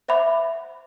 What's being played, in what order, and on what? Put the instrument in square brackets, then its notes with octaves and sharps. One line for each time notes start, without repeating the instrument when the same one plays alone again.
[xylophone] C5 E5 F#5 B5 D6